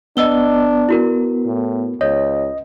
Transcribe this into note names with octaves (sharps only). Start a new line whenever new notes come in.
B3 D4 D#5 E6 G7
E4 F#4 A#4
A2
C#2 C#5 D#5